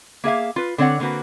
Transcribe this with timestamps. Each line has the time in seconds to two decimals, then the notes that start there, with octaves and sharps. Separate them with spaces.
0.24 A#3 G#4 E5 F5
0.56 F4 B4
0.78 D3 C4 C#5 D5 F#5
1.00 D3 A#3 C4 F#4 B4